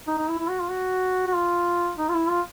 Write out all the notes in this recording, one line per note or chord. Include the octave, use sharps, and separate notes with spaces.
D#4
D#4
E4
E4
F#4
F4
F#4
F#4
F4
D#4
F4
E4
F4